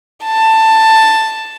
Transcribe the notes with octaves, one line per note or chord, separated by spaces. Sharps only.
A5